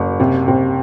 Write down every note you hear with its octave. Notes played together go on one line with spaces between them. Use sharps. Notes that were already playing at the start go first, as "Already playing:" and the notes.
Already playing: F#1
C3
C3